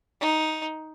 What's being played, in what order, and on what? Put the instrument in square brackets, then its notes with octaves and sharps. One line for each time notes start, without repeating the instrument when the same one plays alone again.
[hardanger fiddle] D#4